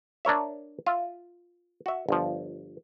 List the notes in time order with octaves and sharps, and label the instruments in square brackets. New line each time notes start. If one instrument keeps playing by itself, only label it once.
[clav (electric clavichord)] D4 A#4 C#5 E5
F4 E5
F#4 E5
G1 F3